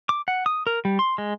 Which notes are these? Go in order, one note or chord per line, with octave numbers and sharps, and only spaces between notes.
D6
F#5
D#6
A#4
G3
C6
G#3